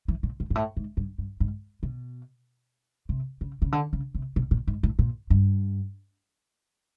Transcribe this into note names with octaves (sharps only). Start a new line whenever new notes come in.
E3
A#2
A2
G#2
A2
G#2
G2
G2
G#2
B2
C3
C#3
C#3
D3
C#3
C3
B2
A#2
G#2
A2
A#2
G2